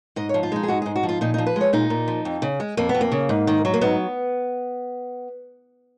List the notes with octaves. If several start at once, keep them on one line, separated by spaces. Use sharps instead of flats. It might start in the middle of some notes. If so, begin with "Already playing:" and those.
G#2 D#5
C#5
F3
F4
G#3 D#4
G#4
G#2 F#4
G#2 G#4
F#4
F3
F4
A#2 D#4
D#4
F3
B4
G#3 C#5
A#2 D#4
A#2
F3
F2
C#3
G#3
F2 A#3
B3
F2
A#3
C#3
G#2
D#3
F#3
A#3
G#2 B3